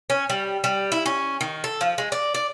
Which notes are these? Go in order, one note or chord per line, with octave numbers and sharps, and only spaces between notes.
C#4
G3
G3
E4
C#4
D#3
A4
F3
G#3
D5
D5